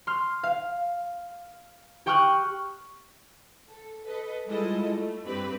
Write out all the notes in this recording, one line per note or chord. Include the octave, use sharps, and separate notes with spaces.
C6 F6
F5
G4 G5 C#6 D#6 F6 F#6
A4
A4 B4 D#5
G3 G#3 E4 F4 A4 D#5
A3
G2 C4 G4 B4 B5